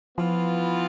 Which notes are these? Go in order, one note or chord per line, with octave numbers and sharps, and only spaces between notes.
E3 F3 B3 F4